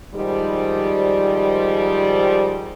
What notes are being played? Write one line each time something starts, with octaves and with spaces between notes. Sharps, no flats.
G#2 D#3 F3 G3